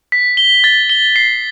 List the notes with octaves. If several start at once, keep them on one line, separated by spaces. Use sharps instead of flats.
B6
G7
A6
G7
C7